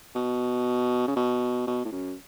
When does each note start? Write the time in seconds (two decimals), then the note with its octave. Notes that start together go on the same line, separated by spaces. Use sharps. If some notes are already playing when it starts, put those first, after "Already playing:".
0.15 B2
1.07 C#3
1.16 B2
1.67 B2
1.85 A2
1.92 F#2